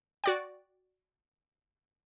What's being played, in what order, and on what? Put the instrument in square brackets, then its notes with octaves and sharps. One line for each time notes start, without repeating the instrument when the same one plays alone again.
[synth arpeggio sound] F#4 D5 G5